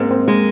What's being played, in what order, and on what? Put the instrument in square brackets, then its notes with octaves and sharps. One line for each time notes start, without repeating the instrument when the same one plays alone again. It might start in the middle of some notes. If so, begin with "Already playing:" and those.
Already playing: [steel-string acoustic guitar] G#2 [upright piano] G#3 A#3 C4
[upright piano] C4
[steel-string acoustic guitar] G#3 [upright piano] A#3